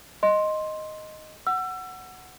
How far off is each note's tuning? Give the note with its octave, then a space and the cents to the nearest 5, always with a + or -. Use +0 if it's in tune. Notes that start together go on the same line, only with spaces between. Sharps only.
D#5 +0 C6 +10
F#5 +0 E6 +30